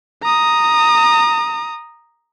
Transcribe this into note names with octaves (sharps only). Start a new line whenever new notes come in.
A#5 D#6